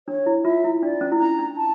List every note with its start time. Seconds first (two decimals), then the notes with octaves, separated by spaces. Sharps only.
0.08 D4 C#5
0.26 E4
0.45 F4 E5
0.64 E4
0.83 D4 D5
1.01 C#4
1.12 E4
1.19 D4 A#5
1.39 D4
1.57 A5